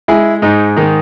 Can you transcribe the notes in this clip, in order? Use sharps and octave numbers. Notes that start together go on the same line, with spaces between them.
G#3 E4 G#4
G#2 D#4
D#3 D#4